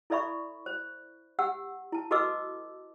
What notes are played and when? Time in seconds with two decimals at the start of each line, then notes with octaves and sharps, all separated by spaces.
0.10 E4 A4 D5 E5 B5 C#6
0.66 C5
1.39 G4 F#5 E6
1.92 E4 A5
2.11 F#4 A4 B4 D#5 D6 E6